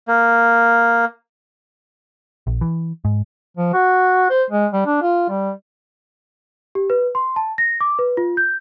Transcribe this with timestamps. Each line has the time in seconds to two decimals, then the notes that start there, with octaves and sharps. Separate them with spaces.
0.08 A#3
2.47 A#1
2.61 E3
3.05 G#2
3.57 F3
3.73 F#4
4.30 C5
4.50 G#3
4.73 G3
4.86 D4
5.02 F4
5.29 G3
6.75 G4
6.90 B4
7.15 C6
7.36 A5
7.58 A#6
7.81 D6
7.99 B4
8.17 F4
8.37 G6